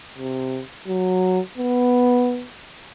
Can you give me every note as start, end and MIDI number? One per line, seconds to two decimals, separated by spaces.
0.18 0.61 48
0.88 1.39 54
1.58 2.46 59